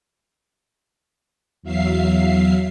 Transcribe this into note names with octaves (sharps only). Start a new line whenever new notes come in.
E2 F#3 E5 F5 C7